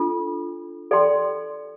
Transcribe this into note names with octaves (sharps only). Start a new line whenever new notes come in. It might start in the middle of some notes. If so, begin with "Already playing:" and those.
Already playing: D4 F4 A4
A4 D5 G5 C6